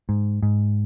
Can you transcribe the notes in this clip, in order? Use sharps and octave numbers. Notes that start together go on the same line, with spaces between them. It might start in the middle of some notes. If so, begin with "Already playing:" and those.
G#2
G#2